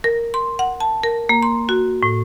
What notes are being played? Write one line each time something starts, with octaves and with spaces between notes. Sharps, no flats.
A#4
C6
F#5
A5
A#4
A#3
C6
F#4
A2